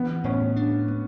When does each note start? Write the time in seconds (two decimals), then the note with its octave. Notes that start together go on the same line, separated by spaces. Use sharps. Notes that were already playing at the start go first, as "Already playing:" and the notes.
Already playing: E3 B3
0.24 A2 C#4
0.56 D4
0.88 B3